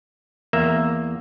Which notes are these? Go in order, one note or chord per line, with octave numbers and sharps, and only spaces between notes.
E2 A#3 E5 A#5